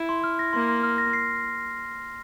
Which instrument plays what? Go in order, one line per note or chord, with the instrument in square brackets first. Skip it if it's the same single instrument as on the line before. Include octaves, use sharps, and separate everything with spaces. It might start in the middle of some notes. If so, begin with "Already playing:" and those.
Already playing: [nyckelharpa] E4
[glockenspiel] C6
F6
A#6
[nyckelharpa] A#3 [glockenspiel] C6
[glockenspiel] C6
F6
A#6
C7